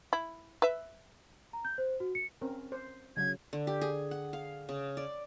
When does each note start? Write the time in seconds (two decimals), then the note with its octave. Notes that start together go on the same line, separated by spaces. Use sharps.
0.13 E4
0.62 B4 E5
1.53 A#5
1.65 G6
1.78 C5
2.00 F#4
2.15 C#7
2.41 C4 C#4 A#4
2.72 C5
3.17 C#3 F#3 G#6
3.53 D3
3.67 G4
3.81 G#4
4.11 F#5
4.33 F5
4.69 C#3
4.97 D5